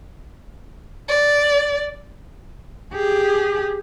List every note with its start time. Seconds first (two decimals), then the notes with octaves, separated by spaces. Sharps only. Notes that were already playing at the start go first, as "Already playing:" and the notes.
1.09 D5
2.94 G4 G#4